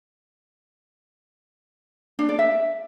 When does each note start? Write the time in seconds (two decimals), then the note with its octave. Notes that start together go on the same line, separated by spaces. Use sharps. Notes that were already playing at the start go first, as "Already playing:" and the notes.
2.19 D4
2.29 D5
2.39 E5